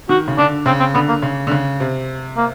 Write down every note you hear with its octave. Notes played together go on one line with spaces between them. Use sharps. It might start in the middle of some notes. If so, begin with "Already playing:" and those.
D#3 F#4
C#3
D3 D4
C#3 C4
C4
D3 B3
A#3
C#3
D3
C#3
C3
A#3